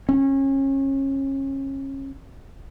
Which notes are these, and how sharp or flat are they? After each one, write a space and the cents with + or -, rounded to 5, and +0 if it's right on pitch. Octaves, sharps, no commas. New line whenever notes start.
C#4 -30